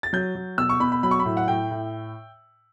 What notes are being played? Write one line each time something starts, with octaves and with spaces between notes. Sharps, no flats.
A6
F#3 G6
F#3
B2 E6
C#6
B2 B5
B5
F#3 B5
C#6
B5
A2
F#5
A2 G5
A2